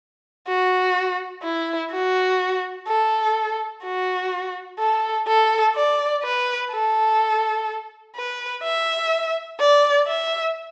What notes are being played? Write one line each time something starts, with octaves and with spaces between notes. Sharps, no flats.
F#4
E4
F#4
A4
F#4
A4
A4
D5
B4
A4
B4
E5
D5
E5